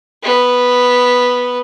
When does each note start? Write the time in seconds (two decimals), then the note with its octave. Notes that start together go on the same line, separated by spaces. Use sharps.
0.23 B3